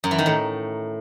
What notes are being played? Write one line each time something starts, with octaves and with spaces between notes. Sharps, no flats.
F#2
E3
D#3
A2